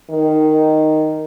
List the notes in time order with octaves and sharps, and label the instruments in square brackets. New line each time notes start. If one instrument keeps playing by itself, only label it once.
[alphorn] D#3